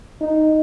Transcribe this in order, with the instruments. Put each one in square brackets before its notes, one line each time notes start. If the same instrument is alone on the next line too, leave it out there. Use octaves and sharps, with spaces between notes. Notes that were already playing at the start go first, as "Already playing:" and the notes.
[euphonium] D#4